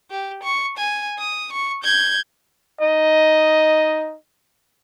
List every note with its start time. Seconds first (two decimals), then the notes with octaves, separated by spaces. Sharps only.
0.10 G4
0.43 C#6
0.78 G#5
1.18 D#6
1.53 C#6
1.84 G6 G#6
2.81 D#4 D#5